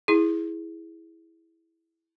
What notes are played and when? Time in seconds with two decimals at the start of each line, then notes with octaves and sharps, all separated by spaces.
0.08 E4 G#4